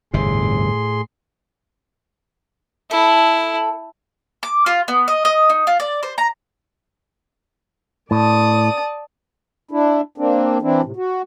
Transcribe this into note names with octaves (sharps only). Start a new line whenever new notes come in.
G1 E2 A2 C3 G#4 C6
E4 A4
D6
F4
B3
D#5
D#5
D#4
F4
D5
C5
A#5
A2 D5 A5 D#6
D4 E4
A#3 C4 D4
E3 C4 D4 E4
A2 C3
F#4